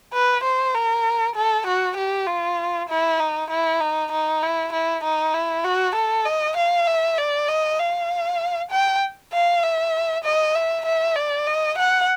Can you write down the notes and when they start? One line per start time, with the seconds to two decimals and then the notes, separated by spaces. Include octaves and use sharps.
0.13 B4
0.43 C5
0.74 A#4
1.35 A4
1.66 F#4
1.96 G4
2.27 F4
2.89 E4
3.19 D#4
3.50 E4
3.80 D#4
4.12 D#4
4.42 E4
4.72 E4
5.03 D#4
5.34 E4
5.64 F#4
5.95 A4
6.25 D#5
6.56 F5
6.87 E5
7.17 D5
7.48 D#5
7.79 F5
8.71 G5
9.32 F5
9.63 E5
10.24 D#5
10.55 E5
10.85 E5
11.16 D5
11.46 D#5
11.78 F#5